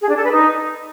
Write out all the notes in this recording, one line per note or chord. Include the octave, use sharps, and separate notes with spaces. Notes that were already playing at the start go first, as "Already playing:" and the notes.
G#4
D4
A4
B4
D#4